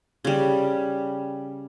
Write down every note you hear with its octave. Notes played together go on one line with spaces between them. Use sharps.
C#3 G3